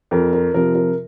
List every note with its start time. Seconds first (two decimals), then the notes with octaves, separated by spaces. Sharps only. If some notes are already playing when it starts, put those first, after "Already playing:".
0.11 F2 A#4
0.33 A#4
0.54 C3 F3 A#4
0.75 A#4